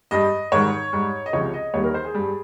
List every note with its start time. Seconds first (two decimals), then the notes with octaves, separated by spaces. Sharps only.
0.11 G2 G3 D#5
0.52 G#2 D#3 G3 C#5
0.93 G#2 G3
1.26 D#5
1.33 C#2 C3 F3 C#5
1.54 D#5
1.74 D#2 D#3 G3 C#5
1.84 A#4
1.94 C5
2.04 G#4
2.14 G2 G3